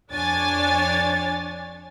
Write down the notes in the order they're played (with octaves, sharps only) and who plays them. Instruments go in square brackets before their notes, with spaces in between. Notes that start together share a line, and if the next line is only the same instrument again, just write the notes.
[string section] F2 D4 C#5 G#5 A6